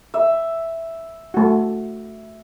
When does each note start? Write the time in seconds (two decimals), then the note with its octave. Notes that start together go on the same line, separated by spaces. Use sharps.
0.14 E5
1.34 A3 F#4